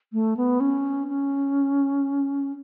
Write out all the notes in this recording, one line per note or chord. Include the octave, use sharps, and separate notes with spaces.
A3
B3
C#4
C#4